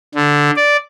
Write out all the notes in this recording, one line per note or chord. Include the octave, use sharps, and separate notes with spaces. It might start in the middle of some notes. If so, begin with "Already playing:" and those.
D3
D5